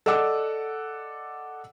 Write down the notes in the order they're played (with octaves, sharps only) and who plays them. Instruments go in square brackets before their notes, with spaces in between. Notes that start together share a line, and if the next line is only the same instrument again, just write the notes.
[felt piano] A4 D5 D#5 F#5 D6 E6